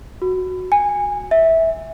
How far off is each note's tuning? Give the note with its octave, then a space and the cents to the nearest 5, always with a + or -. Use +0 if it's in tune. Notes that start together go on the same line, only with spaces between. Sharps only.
F#4 -5
G#5 -20
E5 -15